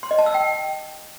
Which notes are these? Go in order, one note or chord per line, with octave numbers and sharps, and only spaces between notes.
C6
D#5
A5
E6
G5